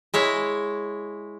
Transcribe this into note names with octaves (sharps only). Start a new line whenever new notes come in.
G#3 E4 C#5